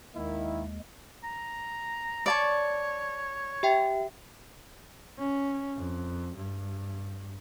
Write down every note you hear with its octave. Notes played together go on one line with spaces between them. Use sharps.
D#2 D#3 G#3 A#3 E4
A#5
C#5 D5 A5 C#6
G4 E5 G5
C#4
F2
G2